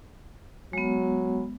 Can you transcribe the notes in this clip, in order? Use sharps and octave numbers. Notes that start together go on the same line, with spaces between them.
F#3 G#3 B3